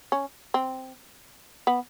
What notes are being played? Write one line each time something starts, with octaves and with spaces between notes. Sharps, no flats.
C#4
C4
B3